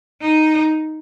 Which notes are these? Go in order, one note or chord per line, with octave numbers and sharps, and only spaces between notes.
D#4